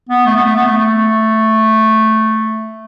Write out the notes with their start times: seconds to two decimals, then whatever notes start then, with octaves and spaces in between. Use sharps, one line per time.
0.09 B3
0.26 A3
0.36 B3
0.45 A3
0.56 B3
0.65 A3
0.77 A3